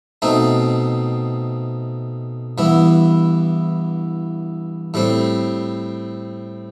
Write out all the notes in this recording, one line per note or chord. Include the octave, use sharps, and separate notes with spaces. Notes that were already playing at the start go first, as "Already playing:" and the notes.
B2 A3 C4 D#4
G2 E3 B3 E4
A2 G3 C4